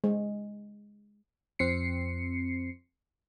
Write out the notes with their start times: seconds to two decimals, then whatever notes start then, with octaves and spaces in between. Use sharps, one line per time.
0.04 G#3
1.59 F2 C4 C7 C#7